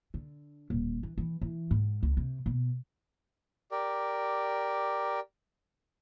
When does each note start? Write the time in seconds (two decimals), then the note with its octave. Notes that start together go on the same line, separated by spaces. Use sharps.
0.14 D3
0.70 D#1
1.03 E3
1.18 E3
1.41 E3
1.71 G#2
2.03 C#2
2.17 C3
2.46 B2
3.71 G4 A#4 D5